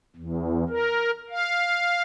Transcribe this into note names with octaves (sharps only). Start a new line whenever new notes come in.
E2
A#4
F5